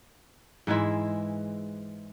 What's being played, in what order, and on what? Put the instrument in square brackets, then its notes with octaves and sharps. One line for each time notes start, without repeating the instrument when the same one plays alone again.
[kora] G#2 E3 G#3 E4